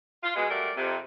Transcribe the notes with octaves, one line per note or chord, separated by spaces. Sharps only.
F4
B2 G#3
F#3 G3 A3 A#4 D5
F2 C3